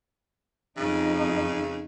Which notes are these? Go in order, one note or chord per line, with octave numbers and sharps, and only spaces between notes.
F2 C#3 D#4